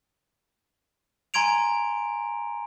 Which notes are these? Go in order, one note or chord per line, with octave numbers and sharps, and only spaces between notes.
G#5 A#5 C6 G#6 D7 F7